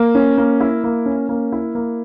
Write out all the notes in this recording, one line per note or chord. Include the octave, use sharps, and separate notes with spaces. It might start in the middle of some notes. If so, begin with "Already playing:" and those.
Already playing: A#3
C#4
A#3
E4
A#3
C#4
A#3
E4
A#3